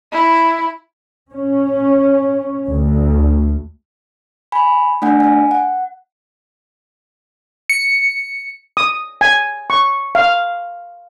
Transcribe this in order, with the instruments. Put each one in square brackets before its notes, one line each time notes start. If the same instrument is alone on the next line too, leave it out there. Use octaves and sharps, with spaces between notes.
[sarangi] E4
[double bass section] C#4
D2
[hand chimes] G#5 B5
A3 D4 F#5 G#5
G#5
F#5
[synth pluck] C#7
[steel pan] D#6
G#5
C#6
F5